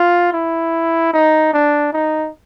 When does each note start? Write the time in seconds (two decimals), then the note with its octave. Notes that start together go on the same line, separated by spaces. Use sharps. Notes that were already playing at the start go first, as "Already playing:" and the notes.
Already playing: F4
0.33 E4
1.13 D#4
1.53 D4
1.93 D#4